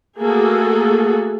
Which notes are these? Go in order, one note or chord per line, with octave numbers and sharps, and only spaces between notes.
A3 A#3 F#4 G#4 A4